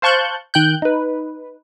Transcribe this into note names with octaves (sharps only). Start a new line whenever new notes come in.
C5 F5 A5 C#6 F#6 G6
D#3 G5 F#6 G6
D#4 B4